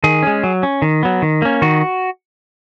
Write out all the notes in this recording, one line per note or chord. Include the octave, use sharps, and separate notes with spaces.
D#3 G#4
G#3 C#4
F#3
C#4
D#3
F#3 B3
D#3
A#3 C#4
D#3 F#4